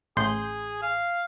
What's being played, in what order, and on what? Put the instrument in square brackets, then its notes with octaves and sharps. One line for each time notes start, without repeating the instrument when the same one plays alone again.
[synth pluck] A1 C6 G6 [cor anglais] G#4
[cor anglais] F5